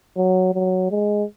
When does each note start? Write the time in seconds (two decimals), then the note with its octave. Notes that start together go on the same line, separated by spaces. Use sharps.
0.17 F#3
0.54 F#3
0.91 G#3